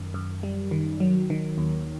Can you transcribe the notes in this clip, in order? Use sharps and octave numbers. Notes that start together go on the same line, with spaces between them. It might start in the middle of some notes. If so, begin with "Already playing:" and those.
Already playing: F#2 D#3
F#2
G3
D#3
F#3
D#3
D#2